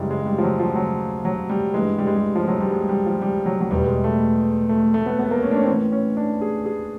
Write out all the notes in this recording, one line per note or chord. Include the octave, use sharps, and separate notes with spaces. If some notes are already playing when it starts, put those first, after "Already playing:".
Already playing: F#2 C#3 E3 G3 G#3
G#3
G3
F3
F#3
F3
F#3
F#3
G3
G2 E3 G#3
G3
G#3
G3
F3
F#3
G3
G#3
G3
F3
G3
F#3
F#3
E2 B2 G3
G#3
A3
A3
A3
B3
B3
A#3
C#4
D4
C#4
C4
A2 E3 C#4
C#4
D4
G#4
G#4